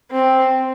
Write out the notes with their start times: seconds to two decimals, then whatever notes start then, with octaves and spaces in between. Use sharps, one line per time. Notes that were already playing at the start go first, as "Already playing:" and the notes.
0.11 C4